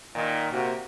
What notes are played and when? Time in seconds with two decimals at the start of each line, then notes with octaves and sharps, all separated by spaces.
0.14 A#2 D#3
0.52 C3 A#3 F#4